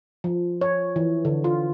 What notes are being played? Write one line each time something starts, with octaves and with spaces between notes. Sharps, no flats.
F3
C#5
E3
D3
F4